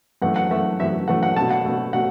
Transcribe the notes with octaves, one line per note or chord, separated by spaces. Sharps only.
F#2 E3 A3 F#5
F#5
F#2 E3 A3 E5
F#2 E3 A3 E5
F#2 E3 A3 F#5
F#5
B2 A3 A5
F#5
B2 A3
B2 A3 F#5